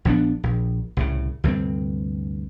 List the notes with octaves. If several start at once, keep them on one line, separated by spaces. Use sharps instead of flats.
A#1 F3 B3 D4
A#1
C2 A2 C#3
D2 G2 C3 C4